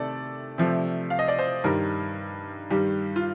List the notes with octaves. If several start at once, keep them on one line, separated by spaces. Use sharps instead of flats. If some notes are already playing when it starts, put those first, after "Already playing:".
Already playing: C3 D#3 A3 A4 D5
C3 F3 A3
F5
D#5
D5
C5
G2 D#3 G3 A#4
G2 D#3 G3 G4
F4